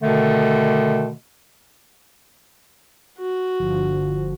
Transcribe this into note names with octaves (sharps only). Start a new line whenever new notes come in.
B2 D3 D#3 A3
F#4
G1 D3 F3